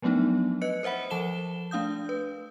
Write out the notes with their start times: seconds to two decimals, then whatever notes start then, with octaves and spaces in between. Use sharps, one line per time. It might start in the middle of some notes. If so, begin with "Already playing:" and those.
0.02 F3 F#3 A3 B3 D4 D#4
0.62 B4 D#5 F#6 C#7
0.83 A#4 C5 E5 F#5 B5
1.10 F3 A4 A5 E7 G7
1.71 A3 D4 F5 D#6 G6
2.09 B4